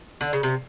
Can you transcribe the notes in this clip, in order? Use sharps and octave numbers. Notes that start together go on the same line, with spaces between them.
D3
C#3
C3